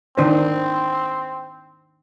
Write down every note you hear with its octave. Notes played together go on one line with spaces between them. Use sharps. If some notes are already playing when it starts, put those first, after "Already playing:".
D#3 C4 D4 C5